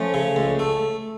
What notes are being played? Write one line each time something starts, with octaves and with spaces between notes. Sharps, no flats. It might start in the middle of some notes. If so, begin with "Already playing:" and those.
Already playing: F3 A3 C#4
C#3
C#2
A3